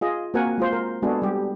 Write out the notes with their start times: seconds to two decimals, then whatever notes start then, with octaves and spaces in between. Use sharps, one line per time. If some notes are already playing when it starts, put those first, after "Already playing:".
0.01 F4 G#4 D#5
0.34 A#3 C4 F#4 A#4 F#5 G#5
0.58 G#3 F4 C5
0.73 A#4
1.02 G#3 B3 D4 F#4 G#4 A4
1.22 G3 G4